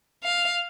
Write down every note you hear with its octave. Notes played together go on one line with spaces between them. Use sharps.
F5